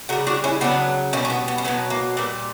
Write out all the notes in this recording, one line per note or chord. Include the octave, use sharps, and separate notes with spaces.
C#3 G3 F#4 A#4
D4 F#4
C#4 E4
C#3 F#3 B3 D4
B2 G3 A#3 C#4
C#4
B3
B3
C#4
B2 F#3 B3
A#3
A#2 G3 B3